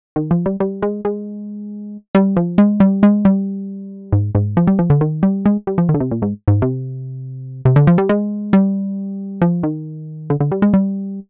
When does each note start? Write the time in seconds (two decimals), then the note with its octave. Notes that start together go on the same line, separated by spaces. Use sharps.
0.16 D#3
0.31 F3
0.46 G3
0.60 G3
0.82 G#3
1.05 G#3
2.15 G3
2.37 F3
2.58 G#3
2.80 G3
3.03 G#3
3.25 G3
4.12 G#2
4.35 G#2
4.57 F3
4.67 G3
4.79 F3
4.90 D3
5.01 D#3
5.23 G3
5.46 G#3
5.67 G3
5.78 F3
5.89 D#3
5.94 D3
6.00 C3
6.11 A#2
6.22 G#2
6.48 G#2
6.62 C3
7.65 C3
7.76 D3
7.87 F3
7.98 G3
8.09 G#3
8.53 G3
9.42 F3
9.63 D#3
10.30 D3
10.40 D3
10.52 G3
10.62 G#3
10.74 G3